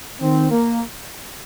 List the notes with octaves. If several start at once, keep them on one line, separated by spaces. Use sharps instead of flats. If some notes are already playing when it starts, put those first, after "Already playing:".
D#3 C4
A#3